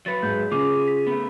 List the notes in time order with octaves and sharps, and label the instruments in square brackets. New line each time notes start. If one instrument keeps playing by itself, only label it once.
[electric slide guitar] F#3 B4 [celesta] A6 C#7
[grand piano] G#2 [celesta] G6
[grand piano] C#3 [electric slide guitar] F4 G#4 [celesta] D6
[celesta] B6
[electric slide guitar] A3 B3